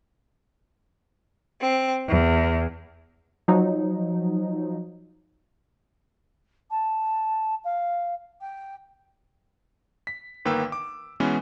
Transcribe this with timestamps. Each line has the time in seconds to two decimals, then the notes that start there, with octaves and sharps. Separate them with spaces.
1.62 C4
2.07 E2
3.48 F3 F#3 D#4
6.70 A5
7.64 F5
8.41 G5
10.07 B6
10.45 G1 D#3 A#3 B4 G5 E6
10.72 D6
11.20 B2 E3 G#3 B3 C#4